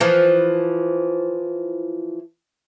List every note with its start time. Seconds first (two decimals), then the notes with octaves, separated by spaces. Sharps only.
0.01 E3 F3